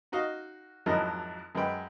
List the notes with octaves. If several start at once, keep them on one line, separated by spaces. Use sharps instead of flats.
D#4 F#4 D#5 F5
G#1 F2 F#3 E4 A#4 D#5
F#2 G#3 B4 G5 B5